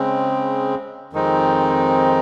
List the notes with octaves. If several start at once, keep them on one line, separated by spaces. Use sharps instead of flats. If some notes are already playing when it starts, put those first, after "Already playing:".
Already playing: C#3 G#3 C4
F2 D#3 G#3 C4 D#4